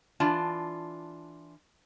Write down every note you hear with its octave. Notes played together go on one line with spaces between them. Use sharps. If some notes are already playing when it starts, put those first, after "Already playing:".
E3 D4 F4 D5 A5